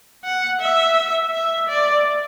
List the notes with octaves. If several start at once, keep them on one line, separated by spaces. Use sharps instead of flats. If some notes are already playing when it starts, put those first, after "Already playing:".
F#5
E5
E5
D5